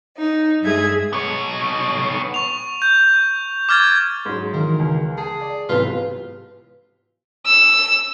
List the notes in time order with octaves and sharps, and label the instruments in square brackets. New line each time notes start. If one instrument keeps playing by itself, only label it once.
[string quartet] D#4
G2 G#3 G#4 E5 G#6
[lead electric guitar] B3 C#5
[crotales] C#6 F7
G6
D6 F6 G#6 A6
[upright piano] G#2 F#3
[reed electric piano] D#3 E3 [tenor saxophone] A#3
[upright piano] C#2
[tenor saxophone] G#4 [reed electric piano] A5
[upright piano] D5
[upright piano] B1 C3 E3 [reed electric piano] G#2 [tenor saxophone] F4 [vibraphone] B4
[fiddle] E6